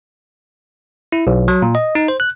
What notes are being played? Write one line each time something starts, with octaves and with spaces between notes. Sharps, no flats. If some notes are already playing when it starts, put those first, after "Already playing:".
E4
B1
F#3
A#2
D#5
D#4
C5
F#6